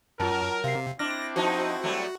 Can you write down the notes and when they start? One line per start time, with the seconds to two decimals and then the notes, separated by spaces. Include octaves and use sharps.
0.20 F#2 F#3 F4 A#4 A5
0.64 C3 F5 C7
0.99 C4 D4 E4 D6 F6 A#6
1.36 F3 D#4 F#4 C5 A5
1.84 F#3 G3 A3